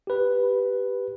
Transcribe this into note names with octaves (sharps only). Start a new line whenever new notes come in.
G4 B4